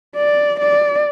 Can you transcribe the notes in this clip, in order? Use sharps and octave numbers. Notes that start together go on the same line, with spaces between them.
D5
D5